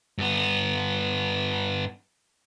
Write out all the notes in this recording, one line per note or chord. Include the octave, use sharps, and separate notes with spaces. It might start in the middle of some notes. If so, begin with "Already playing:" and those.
G2 B3